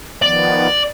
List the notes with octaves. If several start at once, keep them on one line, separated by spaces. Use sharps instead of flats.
D#3 F3 B3 D5